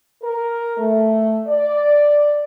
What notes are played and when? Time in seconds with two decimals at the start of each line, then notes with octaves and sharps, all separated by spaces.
0.23 A#4
0.78 A3
1.47 D5